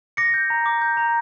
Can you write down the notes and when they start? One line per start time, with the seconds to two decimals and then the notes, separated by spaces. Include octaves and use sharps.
0.17 D6 A#6 C#7
0.34 G6
0.50 A#5
0.66 D6
0.82 G6
0.97 A#5